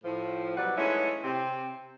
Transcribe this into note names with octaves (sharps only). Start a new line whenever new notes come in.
A2 F3
B2 F#3 G3 B4 D5 F#5
E3 G#3 A3 C#4 D#4 E4
C3 C4